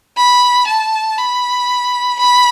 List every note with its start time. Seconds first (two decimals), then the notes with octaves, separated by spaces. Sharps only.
0.17 B5
0.68 A5
1.18 B5
2.19 B5